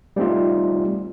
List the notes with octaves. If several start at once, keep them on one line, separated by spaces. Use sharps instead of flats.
G3 A3 C4 D#4 F4